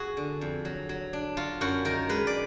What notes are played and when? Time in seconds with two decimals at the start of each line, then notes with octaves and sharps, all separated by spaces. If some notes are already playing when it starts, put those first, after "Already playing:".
Already playing: F#4 G#4
0.17 D3
0.41 F2
0.65 F#3
0.89 F#3
1.13 D4
1.37 F#3 F4
1.61 F#2 F#4
1.85 D#3 A#4
2.09 G#3 B4
2.27 D5